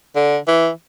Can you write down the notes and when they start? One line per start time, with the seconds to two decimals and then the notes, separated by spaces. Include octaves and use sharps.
0.16 D3
0.48 E3